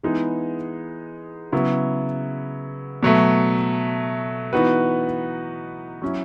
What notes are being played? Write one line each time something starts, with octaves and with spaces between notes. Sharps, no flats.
E3 G#3 B3 D#4 G#4
C#3 F#3 B3 E4
B2 F#3 A3
E3 B3 D#4 F#4 B4
F#3 C#4 E4